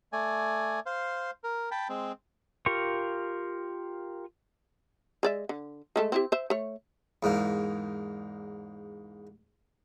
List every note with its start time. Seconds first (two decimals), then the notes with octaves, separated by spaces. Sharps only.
0.13 A3 D5 G#5
0.86 C5 F5
1.44 A#4
1.71 G5 A5 B5
1.89 G#3 C4
2.66 F4 G4 A#4 F5 C#6
5.23 G#3 D5 E5
5.49 D3
5.96 G#3 A3 A4
6.12 C4 E4 G4
6.32 C5 E5
6.50 A3 C#5
7.23 E2 G#2 A#3